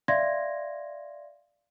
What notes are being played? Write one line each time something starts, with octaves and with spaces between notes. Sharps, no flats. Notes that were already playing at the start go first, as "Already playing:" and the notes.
D5 E5 F5 C6 G#6 A#6